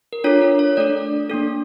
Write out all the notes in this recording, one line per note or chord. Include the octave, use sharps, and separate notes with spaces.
A#4
D4 F4 A4 C#5
A#4
C#5
A3 D4 A4 D5
A#3 D4 A4